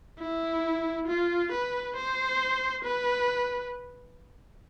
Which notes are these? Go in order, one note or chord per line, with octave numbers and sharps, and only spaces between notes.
E4
F4
B4
C5
B4